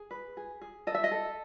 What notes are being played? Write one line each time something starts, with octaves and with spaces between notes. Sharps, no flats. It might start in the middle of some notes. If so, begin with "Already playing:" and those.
Already playing: G#4
B4
G#4
G#4
A4 D#5
E5
D#5
A4